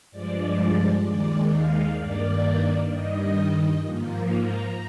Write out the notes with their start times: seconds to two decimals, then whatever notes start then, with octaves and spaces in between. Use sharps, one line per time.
0.11 G2 F3 G#3 D5
1.03 D#2 D#3 G#3 D5
1.50 F5
1.95 G2 D#3 A#3 D5
2.88 G2 D#3 G3 D#5
3.81 G#2 F3 A#3
4.28 A#5